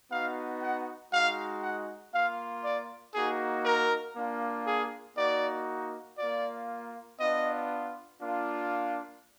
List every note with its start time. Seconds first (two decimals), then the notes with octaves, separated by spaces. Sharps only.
0.10 B3 D#4 F#4 F5
0.62 F#5
1.12 G#3 D#4 F#4 F5
1.63 F#5
2.13 A#3 F4 F5
2.64 D5
3.14 A#3 D#4 F#4 G#4
3.65 A#4
4.15 A#3 D4 F4
4.66 G#4
5.17 A#3 D#4 F#4 D5
6.18 A#3 F4 D5
7.20 B3 D4 F4 D#5
8.20 A#3 D4 F4